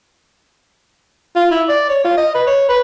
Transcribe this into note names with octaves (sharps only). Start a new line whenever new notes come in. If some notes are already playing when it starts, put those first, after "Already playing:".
F4
E4
D5
C#5
F4
D#5
B4
C#5
B4